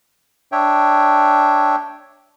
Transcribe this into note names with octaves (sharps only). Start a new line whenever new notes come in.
D4 C#5 E5 G5